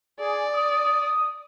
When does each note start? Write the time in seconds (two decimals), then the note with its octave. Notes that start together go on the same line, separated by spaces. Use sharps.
0.20 G#4 D5
0.54 D#6